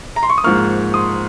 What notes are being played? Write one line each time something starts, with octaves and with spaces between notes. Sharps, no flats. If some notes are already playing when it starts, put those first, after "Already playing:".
A#5
C6
C#6
D#6
G#2 F3 A#3 C#6 F6
C6 D#6